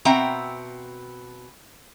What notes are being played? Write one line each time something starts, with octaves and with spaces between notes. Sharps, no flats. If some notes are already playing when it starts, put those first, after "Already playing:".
B2 C4 E5 F#5 G5 A#5